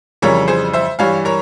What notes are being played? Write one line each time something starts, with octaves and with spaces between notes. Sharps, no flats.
F2 C#3 E3 G3 A#4 C#5
G#4 C5
C5 E5
G2 E3 G3 C#5 F5
A#4 C#5